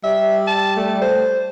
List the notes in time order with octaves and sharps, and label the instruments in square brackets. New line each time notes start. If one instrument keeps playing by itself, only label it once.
[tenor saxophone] G3 [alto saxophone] E5
[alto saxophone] A5
A3
C5